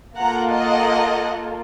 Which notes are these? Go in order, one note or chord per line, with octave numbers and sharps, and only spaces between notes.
A#3 F4 A4 F#5 A#5
D#5 F#5